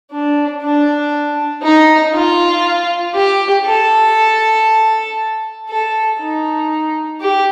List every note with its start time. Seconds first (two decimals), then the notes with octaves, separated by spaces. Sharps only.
0.11 D4
0.62 D4
1.62 D#4
2.14 F4
3.15 G4
3.65 A4
5.69 A4
6.20 D#4
7.21 G4